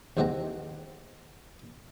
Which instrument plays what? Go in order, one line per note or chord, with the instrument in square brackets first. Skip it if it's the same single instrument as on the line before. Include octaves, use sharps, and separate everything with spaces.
[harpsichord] D#2 E3 G#3 C4 F#5 A#5